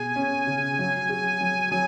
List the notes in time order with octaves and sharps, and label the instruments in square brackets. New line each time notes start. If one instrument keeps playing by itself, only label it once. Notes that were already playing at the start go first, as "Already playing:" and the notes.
Already playing: [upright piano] B2 G#4 [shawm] G#5
[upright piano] C#4
C#3
F#3
G#4
F#3
[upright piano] F#3 [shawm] G#5